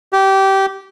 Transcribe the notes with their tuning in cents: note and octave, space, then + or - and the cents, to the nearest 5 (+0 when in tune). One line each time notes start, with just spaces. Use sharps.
G4 -20